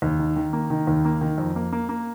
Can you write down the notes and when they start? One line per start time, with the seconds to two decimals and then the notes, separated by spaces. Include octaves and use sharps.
0.02 D#2
0.19 D#3
0.36 D#3
0.53 A#3
0.70 D#3
0.87 D#2
1.05 A#3
1.21 D#3
1.38 F2
1.56 A#3
1.72 A#3
1.89 A#3